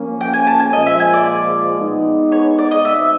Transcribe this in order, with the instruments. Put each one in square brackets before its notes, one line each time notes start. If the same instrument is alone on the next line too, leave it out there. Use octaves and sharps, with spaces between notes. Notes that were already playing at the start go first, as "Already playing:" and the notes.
Already playing: [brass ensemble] F3 A#3 C#4
[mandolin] G5
G#5
A5
G#5
[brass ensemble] A#2 F3 G#3 [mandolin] D#5
[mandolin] E5
G#5
D5
[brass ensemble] G#3 B3 D#4
[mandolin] C#5
D5
D#5
[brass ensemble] B2 G#3 C4 D#4 [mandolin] E5